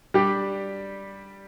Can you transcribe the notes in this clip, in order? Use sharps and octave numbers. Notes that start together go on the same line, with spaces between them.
G3 D4 G4